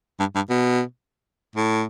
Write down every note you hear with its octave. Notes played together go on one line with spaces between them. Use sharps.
G2
G2
B2
A2